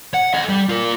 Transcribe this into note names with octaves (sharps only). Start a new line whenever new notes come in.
F#5
A4 D#5
G3
F4 A#4